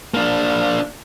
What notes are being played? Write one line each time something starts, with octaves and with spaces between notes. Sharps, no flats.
A#3 D4